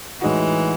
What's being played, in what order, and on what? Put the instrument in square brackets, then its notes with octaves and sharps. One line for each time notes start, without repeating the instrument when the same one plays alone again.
[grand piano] A2 G#3 D#4 F#4 [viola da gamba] E3